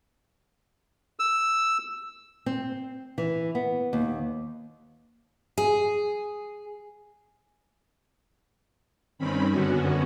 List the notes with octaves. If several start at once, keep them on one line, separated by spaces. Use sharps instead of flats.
E6
C4
E3
B3
D#2
G#4
G2 D#3 C4 C#4 B5
F#2 D3 B3 C#4 F#4